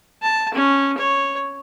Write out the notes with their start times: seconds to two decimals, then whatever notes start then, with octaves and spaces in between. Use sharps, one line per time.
0.23 A5
0.54 C#4
0.98 C#5